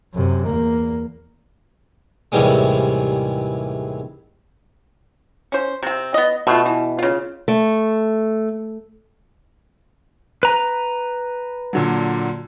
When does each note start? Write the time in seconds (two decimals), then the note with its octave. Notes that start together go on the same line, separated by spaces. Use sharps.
0.14 F#2 C3
0.46 E2 A#3
2.32 D#2 A2 C3 E3 G3 G#3
5.52 C#4 C5
5.83 C3 C4
6.14 B3 D#5
6.47 B2 A3 F4
6.66 E3
6.99 C#3 F4
7.48 A3
10.43 B4 A#5
11.73 A#2 D3 F#3